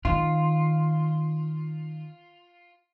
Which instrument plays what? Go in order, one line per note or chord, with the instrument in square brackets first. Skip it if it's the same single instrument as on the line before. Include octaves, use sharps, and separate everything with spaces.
[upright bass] D#3 [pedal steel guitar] F4